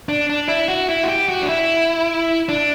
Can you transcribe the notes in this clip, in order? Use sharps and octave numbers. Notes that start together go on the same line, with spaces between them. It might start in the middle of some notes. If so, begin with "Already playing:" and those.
D4
D4
E4
F#4
E4
F#4
G4
F#4
D4
E4
D4